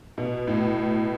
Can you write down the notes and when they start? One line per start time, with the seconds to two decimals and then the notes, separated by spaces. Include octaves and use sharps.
0.18 B2
0.47 A2